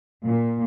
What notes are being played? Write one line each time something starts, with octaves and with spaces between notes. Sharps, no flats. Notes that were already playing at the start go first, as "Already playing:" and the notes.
A#2